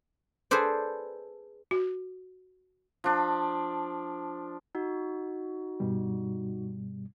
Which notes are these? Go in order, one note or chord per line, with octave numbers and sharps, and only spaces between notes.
G#4 A4 B4 C5 D5
F#4
F3 D4
D#4 F#4
G2 B2 G3